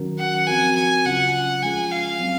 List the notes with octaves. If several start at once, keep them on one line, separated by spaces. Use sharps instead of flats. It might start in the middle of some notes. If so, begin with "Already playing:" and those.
Already playing: D#3 F#3 C#4 F#4 A#4
F#5
F3 C4 F#4 A#4 G#5
G#5
C#3 F#3 C#4 F4 F#5
F3 G#3 C#4 F4 G#4 G#5
F5
F#3 C4